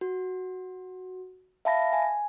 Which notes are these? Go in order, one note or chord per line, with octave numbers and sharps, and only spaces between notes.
F#4
E5 F5 A5 B5 A#6
G#5